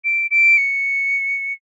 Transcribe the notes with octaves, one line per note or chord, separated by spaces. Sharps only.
D7
D7
C#7